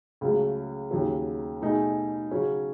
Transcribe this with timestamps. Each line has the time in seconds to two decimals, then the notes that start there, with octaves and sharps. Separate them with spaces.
0.21 C#2 C#3 F#3 A3
0.91 D#2 C#3 F#3
1.61 B2 A3 D#4 G#4
2.31 C#3 F#3 C#4